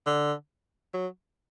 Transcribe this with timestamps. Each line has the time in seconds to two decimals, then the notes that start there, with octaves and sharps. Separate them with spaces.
0.06 D3
0.94 F#3